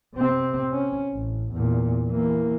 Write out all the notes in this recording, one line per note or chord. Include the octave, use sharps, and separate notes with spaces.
C3 C4
C#4
A1
E2 A#2
E3 A#3